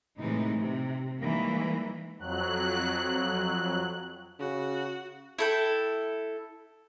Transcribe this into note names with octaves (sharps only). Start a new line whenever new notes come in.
A2 C3 E3 G#3 D#4
C3
D#3 E3 G3 G#3 A#3
F2 F#3 F#6
C#3 F#4
E4 A4 G5